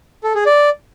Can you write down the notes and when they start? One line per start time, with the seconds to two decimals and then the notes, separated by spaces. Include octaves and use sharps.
0.24 A4
0.35 G#4
0.46 D5